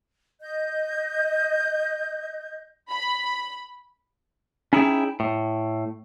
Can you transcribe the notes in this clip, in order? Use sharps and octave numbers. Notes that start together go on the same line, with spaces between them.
D#5 G6
B5
C#4 D#4 E4 G4 G#4 G5
A2